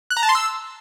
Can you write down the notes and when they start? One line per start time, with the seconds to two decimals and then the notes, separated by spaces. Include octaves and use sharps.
0.10 F#6
0.17 A#5
0.23 A5
0.29 C6
0.35 E6